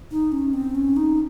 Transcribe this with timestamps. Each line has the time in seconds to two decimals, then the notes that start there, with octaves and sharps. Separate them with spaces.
0.11 D#4
0.32 C#4
0.53 C4
0.75 C#4
0.96 D#4